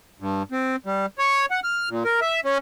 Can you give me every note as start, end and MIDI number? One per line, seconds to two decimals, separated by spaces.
0.20 0.43 43
0.52 0.76 60
0.86 1.06 55
1.19 1.46 73
1.51 1.60 78
1.64 1.89 89
1.89 2.03 46
2.05 2.20 70
2.22 2.40 76
2.45 2.58 61